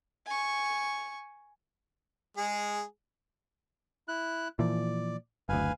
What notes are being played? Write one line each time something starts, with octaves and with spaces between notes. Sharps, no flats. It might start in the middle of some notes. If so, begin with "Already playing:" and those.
G#5 C#6
G#3 G#4
E4 F#6
A#2 E3 F3 D5
F#1 D2 B4 F5 G#5